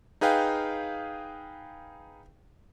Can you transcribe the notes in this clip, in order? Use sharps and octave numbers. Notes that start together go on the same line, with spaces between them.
D#4 G#4 B4 F5 G5